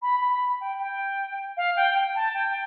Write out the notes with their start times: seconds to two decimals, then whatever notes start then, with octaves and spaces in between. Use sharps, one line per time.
0.02 B5
0.21 B5
0.41 B5
0.60 G5
0.79 G5
1.57 F5
1.76 G5
1.95 G5
2.15 A5
2.34 G5